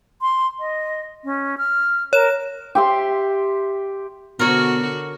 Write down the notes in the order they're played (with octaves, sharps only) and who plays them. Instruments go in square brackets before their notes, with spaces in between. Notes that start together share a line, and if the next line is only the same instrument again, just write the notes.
[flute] C6
D#5
C#4
F6
[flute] A#4 [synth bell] C#5 E7
[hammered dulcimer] G4 E5 C6
[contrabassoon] B2 [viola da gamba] D3 F#4 [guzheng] A#4 C#5